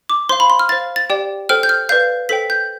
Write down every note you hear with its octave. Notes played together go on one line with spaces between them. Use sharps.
D6
C5 F5 C6
B5
C6
F6
C5 F5 A6
A6
G4 D5 G5
A4 C5 G5 F6
G6
F6
B4 D5 F5 G6
A4 C5 G5 B6
G6